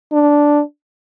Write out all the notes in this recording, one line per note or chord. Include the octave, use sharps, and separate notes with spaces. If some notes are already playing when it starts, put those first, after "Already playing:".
D4